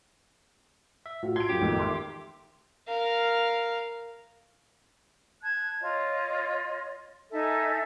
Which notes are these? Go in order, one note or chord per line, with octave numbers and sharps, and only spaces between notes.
E5
A2 F4 F#4
C6 G#6 D7
F#2 C#3 G4
A1 F2 D#3
E5 C6 D6
A#4 F5
A5 F#6 G#6
F4 C#5 D#5
D#4 A4 E5 G#5